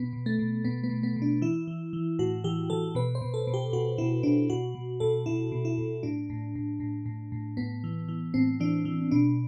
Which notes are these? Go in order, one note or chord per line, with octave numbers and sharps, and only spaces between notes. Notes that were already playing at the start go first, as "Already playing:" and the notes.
Already playing: B2 B3
B2
A3
B2
B2 B3
B3
B2
B3
B2
D4
E3 E4
E3
E3
A2 F#4
E3 G4
E3 A4
B2 B4
C5
B2
A4
B2
G4
B2 F#4
B2 E4
B2 D4
B2 F#4
B2
B2 A4
B2 E4
B2
E4
B2
A2 D4
A2
A2
A2
A2
A2
A2 B3
E3
E3
A2 C4
E3 D4
E3
B2 D4